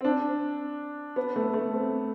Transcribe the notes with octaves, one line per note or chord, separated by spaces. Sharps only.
C4
D4
B3
A3
A3
C4